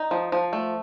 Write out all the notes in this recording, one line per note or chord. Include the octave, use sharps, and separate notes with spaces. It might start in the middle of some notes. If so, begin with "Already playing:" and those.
Already playing: D#4
F3
F3
A3